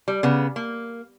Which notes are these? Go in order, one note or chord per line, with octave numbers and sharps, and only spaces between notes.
G3
C#3 B3
A#3